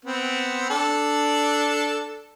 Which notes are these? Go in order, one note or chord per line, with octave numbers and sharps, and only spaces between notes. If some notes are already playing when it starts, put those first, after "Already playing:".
B3 C4
D4 A4